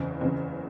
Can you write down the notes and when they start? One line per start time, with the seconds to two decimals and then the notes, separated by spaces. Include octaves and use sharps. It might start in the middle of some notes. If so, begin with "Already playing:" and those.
Already playing: F#1 E2 C#3
0.21 F#1 E2 C#3